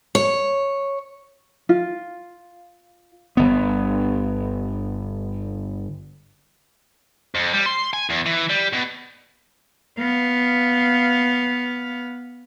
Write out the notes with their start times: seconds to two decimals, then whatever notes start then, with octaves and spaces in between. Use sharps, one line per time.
0.15 C#5
1.69 F4
3.37 G1 B3
7.35 F2
7.53 G3
7.66 C6
7.93 G#5
8.10 E2
8.26 E3
8.49 G3
8.73 B2
9.99 B3 F5